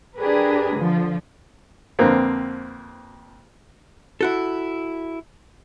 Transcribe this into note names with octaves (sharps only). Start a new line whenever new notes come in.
D4 G4 G#4 A#4 B4
D3 F3
F2 D3 A#3 C4 B4
E4 F#4 A4